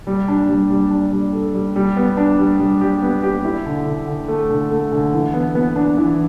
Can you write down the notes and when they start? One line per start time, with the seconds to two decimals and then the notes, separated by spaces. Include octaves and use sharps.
0.07 G3
0.28 D4
0.49 G3
0.70 G3
0.91 D4
1.13 G3
1.33 A4
1.54 G3
1.76 G3
1.97 B3
2.17 D4
2.39 G3
2.60 G3
2.81 G4
3.02 B3
3.23 G4
3.45 E4
3.66 D3
3.86 D3
4.08 D3
4.28 A3
4.50 D3
4.71 A3
4.92 D3
5.13 E3
5.34 B3
5.55 B3
5.76 D4
5.97 E3